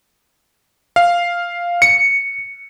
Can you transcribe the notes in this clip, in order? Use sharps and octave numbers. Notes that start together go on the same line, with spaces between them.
F5
C#7